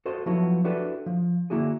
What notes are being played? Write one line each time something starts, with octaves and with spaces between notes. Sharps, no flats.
F#4 A4 C5 D#5
F3 F#3 B3 E4 F#4
D4 E4 F#4 G4 A4 B4
F3
D3 A#3 E4 F#4 G#4